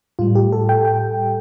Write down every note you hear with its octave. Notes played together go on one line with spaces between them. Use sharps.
A2 G3 F4
G4
A4
G5
G5